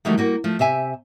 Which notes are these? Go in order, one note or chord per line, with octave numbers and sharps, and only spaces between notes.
D#3 E3 F#3 G3 A3 D#4
G3 A#3 F#4
F3 A3
C3 G4 E5 G#5